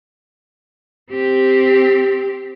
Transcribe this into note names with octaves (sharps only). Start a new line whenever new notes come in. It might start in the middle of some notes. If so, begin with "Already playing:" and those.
C4 G4